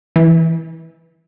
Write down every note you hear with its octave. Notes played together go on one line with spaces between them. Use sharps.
E3